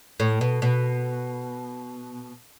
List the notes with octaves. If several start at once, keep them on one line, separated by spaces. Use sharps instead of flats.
A2
B2
B2